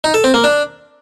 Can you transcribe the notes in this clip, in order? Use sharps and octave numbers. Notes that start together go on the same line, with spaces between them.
D#4
A4
C4
A#3
D4